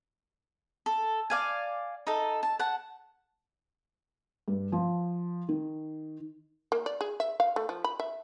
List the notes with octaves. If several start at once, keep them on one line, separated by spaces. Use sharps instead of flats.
A4
D5 F5 G#5
D#4 A4
A5
F#5 A5
G2
F3
D#3
A#3
D5
G#4
E5
F5
A3
F3
B5
E5